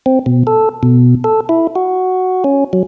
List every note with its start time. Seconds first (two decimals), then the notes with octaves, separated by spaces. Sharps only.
0.06 C4
0.26 B2
0.47 A4
0.83 B2
1.24 A4
1.49 E4
1.76 F#4
2.44 C#4
2.73 F#3